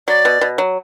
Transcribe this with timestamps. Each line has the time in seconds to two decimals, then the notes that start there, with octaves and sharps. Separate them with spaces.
0.08 F#3 D5
0.25 B2
0.41 B2
0.58 F#3